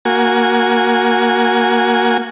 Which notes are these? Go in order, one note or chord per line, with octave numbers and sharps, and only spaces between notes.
A#3 F#4 G#5